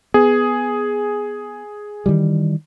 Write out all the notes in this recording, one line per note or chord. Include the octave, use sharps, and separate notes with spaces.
B3 G#4
D#3 E3 G3